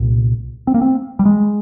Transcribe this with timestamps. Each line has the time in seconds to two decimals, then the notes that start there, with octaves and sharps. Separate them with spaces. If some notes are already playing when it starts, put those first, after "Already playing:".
Already playing: C2 A#2
0.67 C4
0.74 A#3
0.81 C4
1.19 G3
1.25 G#3